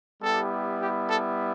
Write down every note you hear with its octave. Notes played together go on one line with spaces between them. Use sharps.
G3 B3 E4 G4 A4
G4
A4